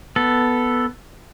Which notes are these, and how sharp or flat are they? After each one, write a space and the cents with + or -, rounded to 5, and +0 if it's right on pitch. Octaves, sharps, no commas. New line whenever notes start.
B3 +0 A4 +0